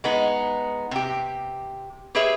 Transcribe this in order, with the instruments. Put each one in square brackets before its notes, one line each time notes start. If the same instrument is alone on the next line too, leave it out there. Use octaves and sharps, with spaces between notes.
[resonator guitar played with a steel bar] G#3 B3 D#4
C3 G4
G4 G#4 B4 C#5 E5